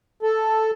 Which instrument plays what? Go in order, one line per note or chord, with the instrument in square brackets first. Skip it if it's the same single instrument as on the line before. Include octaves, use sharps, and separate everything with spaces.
[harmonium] A4